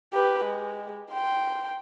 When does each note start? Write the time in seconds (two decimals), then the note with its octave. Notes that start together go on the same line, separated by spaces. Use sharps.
0.14 G4 B4
0.44 G#3
1.11 G5 C6